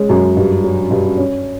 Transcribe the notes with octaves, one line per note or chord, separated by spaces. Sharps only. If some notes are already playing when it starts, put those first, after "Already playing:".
Already playing: G#3 C#4
F#2
G2
F#3
G2
C#4